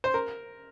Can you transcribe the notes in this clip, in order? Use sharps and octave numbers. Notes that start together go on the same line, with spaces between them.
C5
A#4